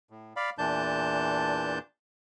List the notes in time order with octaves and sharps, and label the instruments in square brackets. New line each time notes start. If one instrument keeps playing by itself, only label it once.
[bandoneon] A2
D5 F5 B5
E2 A#2 E3 D4 A5 G6